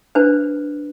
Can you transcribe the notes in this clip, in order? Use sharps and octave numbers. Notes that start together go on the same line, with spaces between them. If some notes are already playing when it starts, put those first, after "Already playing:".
D4 B4 C5